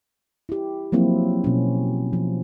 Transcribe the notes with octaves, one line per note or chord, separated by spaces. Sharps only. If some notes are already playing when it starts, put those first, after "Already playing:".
E4 G4
F3 F#3 A#3 C4 E4
B2 C#4
F3